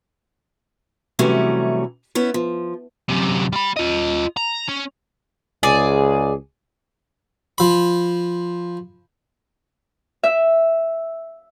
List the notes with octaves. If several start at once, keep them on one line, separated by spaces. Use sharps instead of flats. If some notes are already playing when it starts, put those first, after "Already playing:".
C3 E3 F#3 G3 A3 C#4
B3 C#4 E4
F3
F#2 C3
G3 B5
F4 D#5
A#5
C#4
C#2 G#4 D5
F3 B5
E5